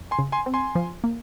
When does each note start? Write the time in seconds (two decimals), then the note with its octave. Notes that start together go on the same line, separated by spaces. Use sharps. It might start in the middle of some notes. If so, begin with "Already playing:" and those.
Already playing: F2
0.11 G#5 C6
0.19 C#3
0.32 G#5 C6
0.46 C4
0.54 G#5 C6
0.75 F3
1.04 A#3